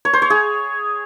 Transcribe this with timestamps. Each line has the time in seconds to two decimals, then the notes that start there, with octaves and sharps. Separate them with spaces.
0.05 C#5
0.13 C5
0.22 C#5
0.30 G#4